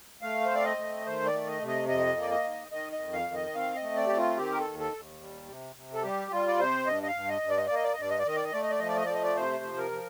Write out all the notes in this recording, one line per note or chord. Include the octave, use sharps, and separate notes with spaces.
A3 F5
C5
C4 D5
D#5
A3
D#3 C5
D5
A3
D#5
C3
D#5
F2 D#5
A#3
D5
D#5
D#3
D#3 D#5
D#5
F2
F5
D#3
D#5
C4 F5
D#5
A3
D5
C4 G4
F4
D#3 G4
A#4
A4
D#2
A4
D#2
G3
C3
C3
A4
G3 G4
G3 F4
D5
C3 C5
G2 D#5
D#5
F5
G2
D#5
G2
D5
D#5
A#3 D5
D#5
D5
D#5
G2 D5
D#5
D5
D#3 D#5
D5
D#5
A3 D5
D#5
D5
F3 D#5
D5
D#5
A3 D5
D#5
D5
C3 C5
F3
A#4
F3